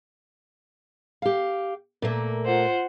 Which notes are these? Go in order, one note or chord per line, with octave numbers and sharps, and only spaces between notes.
G4 F5
A#2 A3 A#3
F4 C5 F#5